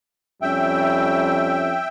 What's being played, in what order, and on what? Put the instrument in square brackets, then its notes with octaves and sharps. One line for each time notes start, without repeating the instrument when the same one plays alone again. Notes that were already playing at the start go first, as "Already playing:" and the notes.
[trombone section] F2 G3 C#4 [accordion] E5 G5